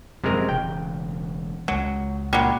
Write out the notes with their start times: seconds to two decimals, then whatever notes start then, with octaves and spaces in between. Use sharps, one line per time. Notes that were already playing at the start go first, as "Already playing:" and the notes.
0.24 F#2 A2 C3 F3 G#3 A#4
0.49 E1 C#3 G5
1.68 C#2 F#3 G#3
2.33 A#2 F#3 G3